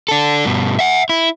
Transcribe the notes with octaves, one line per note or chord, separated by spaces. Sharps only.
D4 A4
G2 B2
E5 F#5
E4